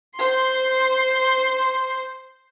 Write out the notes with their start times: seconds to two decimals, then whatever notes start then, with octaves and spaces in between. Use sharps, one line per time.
0.16 C5 C6